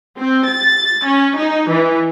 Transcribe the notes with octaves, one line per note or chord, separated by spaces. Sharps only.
C4
A6
C#4
D#4
E3